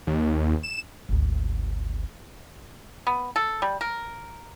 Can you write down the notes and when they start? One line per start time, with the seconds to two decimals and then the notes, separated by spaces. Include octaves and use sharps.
0.07 D#2
0.63 E7
1.09 G#1 D2
3.07 B3
3.36 A4
3.62 G3
3.81 A#4